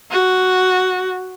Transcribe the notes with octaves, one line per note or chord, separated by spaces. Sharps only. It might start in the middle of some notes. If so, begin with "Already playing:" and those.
F#4